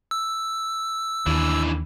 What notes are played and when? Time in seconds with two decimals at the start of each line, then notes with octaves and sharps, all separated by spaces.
0.11 E6
1.27 D#2 D3 E3